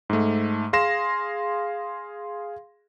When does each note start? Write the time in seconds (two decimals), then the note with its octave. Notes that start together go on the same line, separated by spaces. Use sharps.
0.10 G#2 A3
0.73 G#4 F5 C6 A#6 E7